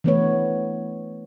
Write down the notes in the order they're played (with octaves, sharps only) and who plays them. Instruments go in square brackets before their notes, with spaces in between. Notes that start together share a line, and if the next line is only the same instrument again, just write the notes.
[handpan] E3 A3 B3 D4 B4 C#5